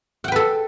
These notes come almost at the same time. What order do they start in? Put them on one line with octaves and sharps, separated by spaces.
F#5 G5 B4 A4